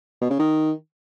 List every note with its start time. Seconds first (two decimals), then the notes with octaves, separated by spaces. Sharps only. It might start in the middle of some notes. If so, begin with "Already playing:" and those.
0.21 B2
0.30 C#3
0.39 D#3